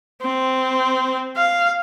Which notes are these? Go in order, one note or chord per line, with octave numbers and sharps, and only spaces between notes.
C4
F5